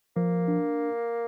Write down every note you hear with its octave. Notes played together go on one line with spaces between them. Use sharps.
F3 A#3
D4